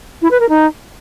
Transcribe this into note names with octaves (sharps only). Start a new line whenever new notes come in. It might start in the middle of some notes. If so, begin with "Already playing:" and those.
E4
B4
A#4
D#4